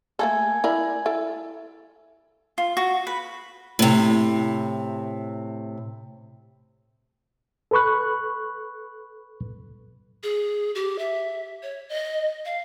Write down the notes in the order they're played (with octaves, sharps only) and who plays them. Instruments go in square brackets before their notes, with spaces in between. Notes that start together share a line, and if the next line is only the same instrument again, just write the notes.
[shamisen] A3 A#3 A4 [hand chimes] G#5 G#6
[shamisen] E4 A#4 D5
E4 A4
[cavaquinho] F4
F#4
B4
[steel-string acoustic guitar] A2 C3
[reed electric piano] A4 B4 B5 C#6 F#6
[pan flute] G#4
G4
E5
C#5
D#5
F5